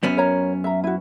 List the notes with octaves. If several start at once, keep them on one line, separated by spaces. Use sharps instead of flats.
F#2 B3 C#4
A#4 C#5 A#5
E5 A#5
E4 F#4